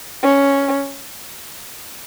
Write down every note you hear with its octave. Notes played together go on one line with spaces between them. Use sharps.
C#4